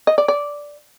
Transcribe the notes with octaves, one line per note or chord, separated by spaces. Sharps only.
D#5
D5
D5